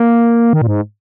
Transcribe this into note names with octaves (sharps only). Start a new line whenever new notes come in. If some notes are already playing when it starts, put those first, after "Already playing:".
Already playing: A#3
D#3
A#2
G#2